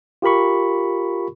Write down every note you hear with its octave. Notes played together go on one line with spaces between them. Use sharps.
F4 G4 A#4 B5 C#6